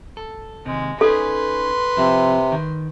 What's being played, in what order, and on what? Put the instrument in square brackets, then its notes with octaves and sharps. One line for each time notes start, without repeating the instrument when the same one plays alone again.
[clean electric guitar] A4
[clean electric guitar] D#2 C3 [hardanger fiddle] G#3
[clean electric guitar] C#4 D#4 G#4 [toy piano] A4 [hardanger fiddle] B4 C6
[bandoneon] C3 [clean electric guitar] F3 C4
[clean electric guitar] D#3